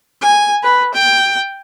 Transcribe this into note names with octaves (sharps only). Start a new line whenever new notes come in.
G#5
B4
G5